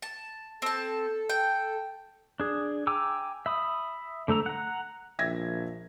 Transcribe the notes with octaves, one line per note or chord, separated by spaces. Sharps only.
A5
C4 A4 A5
G5
D4 G#4
G5 G#5 A#5 D6 E6
E5 B5 D#6
D3 A3 A4 A#5
F#5 A#5
A#1 E5 G#6 A#6